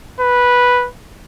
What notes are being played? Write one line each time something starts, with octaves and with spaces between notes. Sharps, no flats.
B4